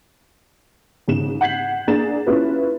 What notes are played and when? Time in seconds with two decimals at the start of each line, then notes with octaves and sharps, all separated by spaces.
1.08 G#1 C#3 E7
1.41 F#5 G6 G#6 B6 C7 F#7
1.87 A#3 D4 G#4 A6 E7
2.27 C#4 E4 F4 B4